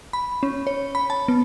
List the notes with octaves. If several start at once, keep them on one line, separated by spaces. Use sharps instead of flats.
B5
C#4
C#5
B5
A5
B3